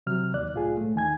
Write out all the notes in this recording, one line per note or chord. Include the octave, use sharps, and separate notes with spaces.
C3 F#3 F6
D#2 D5 F#6
C2 A2 F4 G#4
A2 A3
D#2 D#3 G#5 G#6